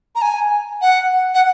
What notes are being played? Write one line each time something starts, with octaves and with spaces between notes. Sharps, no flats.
A#5
G#5
F#5
F#5